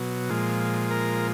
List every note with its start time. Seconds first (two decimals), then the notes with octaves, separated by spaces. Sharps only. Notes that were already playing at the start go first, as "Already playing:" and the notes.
Already playing: B2 F#3
0.29 A#2 F3 G#3
0.91 A#4